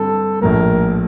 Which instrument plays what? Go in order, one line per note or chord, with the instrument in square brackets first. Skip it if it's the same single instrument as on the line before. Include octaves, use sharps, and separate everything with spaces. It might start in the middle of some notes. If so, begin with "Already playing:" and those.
Already playing: [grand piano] G2 D3 G3 C4 [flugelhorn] A4
[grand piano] A#1 A2 F3 A#3 [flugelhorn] A#4